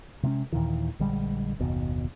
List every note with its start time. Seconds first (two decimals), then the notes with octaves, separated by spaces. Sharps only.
0.23 C3 G#3 C4 C#4
0.52 D#2 A#2 D#3 E3
1.00 A#1 D3 G3 G#3
1.60 F#1 D#2 B2